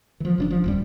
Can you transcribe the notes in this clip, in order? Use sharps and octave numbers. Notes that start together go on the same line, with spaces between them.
E3 F3
F#1 D3 D4
F3
D1 F#2 G3